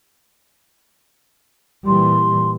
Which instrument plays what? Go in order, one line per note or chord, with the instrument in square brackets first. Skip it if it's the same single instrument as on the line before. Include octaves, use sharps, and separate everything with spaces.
[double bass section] A#2 E3 G3 [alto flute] C6